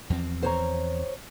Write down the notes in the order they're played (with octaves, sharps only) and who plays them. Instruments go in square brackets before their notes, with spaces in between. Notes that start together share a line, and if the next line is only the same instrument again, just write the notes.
[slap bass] E2 F3 C4
[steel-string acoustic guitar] C5 C#5 A#5